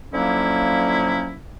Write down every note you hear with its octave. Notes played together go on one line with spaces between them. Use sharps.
D3 F3 F#3 A#3 C#4 E4